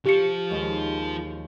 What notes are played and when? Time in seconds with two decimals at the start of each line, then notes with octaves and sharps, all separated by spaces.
0.06 F3 F4 G4 C#7
0.49 D#2 G#3 C#5